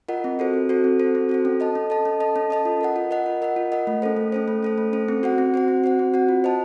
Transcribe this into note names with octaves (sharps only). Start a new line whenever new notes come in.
F4 A#4 D#5 F#5
C4
F#4 A4 C5
C4
F#4 A4 C5
C4
F#4 A4 C5
C4
F#4 A4 C5
C#4
A4 D#5 A5
C#4
A4 D#5 A5
C#4
A4 D#5 A5
C#4
A4 D#5 A5
F4
A#4 D#5 F#5
F4
A#4 D#5 F#5
F4
A#4 D#5 F#5
F4
A#4 D#5 F#5
A3
C#4 A4 C5
A3
C#4 A4 C5
A3
C#4 A4 C5
A3
C#4 A4 C5
C4
F#4 C5 F#5
C4
F#4 C5 F#5
C4
F#4 C5 F#5
C4
F#4 C5 F#5
F4
C5 D#5 A5